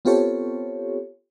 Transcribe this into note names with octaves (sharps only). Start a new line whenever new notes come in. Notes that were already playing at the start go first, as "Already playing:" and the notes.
B3 C4 F4 G4 A4 C#5